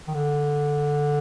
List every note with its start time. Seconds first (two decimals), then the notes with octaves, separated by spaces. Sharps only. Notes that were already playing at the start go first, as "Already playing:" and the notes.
0.07 D#3
0.14 D3